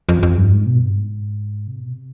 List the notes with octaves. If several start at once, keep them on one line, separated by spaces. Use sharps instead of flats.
F2
F2
G2
G#2
B2
G2
G#2
C3
B2
C3